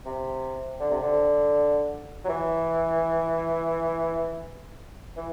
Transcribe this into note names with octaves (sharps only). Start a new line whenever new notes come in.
C3
D3
C3
D3
F#3
E3
E3